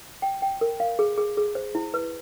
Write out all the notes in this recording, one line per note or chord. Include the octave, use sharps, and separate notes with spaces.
G5
G5
A#4
F5
G#4
G#4
G#4
C5
E4
B4